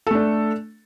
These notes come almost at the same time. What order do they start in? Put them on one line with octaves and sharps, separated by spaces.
A4 A3 D4